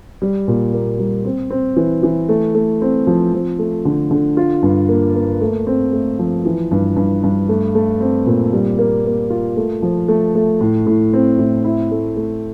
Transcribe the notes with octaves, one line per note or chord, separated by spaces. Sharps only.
G3
A#2
A#3
G3
C4
C4
E3
E3
A3
A3
C4
F3
F3
A3
D3
D3
F4
G2
A#3
A#3
A3
C4
A3
F3
E3
G2
G2
G2
A3
A3
C4
A#2
G3
A#3
A#3
F4
A3
F3
A3
A3
A2
A2
C4
A2
E4
A3
A3